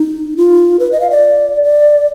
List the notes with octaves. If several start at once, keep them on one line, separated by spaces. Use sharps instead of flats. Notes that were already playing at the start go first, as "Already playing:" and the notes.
Already playing: D#4
F4
B4
D#5
F5
D5
D5